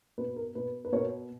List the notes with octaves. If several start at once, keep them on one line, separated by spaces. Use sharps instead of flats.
B2 B4
A#4
B2 B4
B4
B2 A#4 C#5